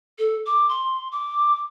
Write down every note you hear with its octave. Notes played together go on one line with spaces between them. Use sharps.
A4
D6
C6
D6